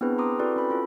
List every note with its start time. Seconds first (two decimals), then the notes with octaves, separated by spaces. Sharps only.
0.01 B3 C4 D4 E4 G#4 B4
0.18 A#5 C6 D6 D#6
0.39 C4 E4 F#4 A4 B4 D5
0.56 C#4 B5
0.70 F4 A4